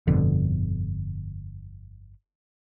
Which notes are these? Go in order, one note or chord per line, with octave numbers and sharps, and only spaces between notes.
G1 F2 B2 D3